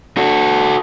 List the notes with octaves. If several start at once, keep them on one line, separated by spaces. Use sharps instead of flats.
F#4 A4